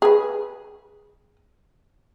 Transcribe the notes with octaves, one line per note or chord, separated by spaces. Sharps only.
G#4 B4